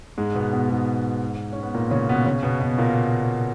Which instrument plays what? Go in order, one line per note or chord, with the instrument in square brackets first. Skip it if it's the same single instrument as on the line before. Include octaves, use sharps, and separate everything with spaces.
[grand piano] G#2 G#3
B2 B3
B2 B3
G#2 G#3
C#4
B3
A#2 A#3
C#3 C#4
B2 B3
C#3 C#4
B2 B3
B2 B3
A#2 A#3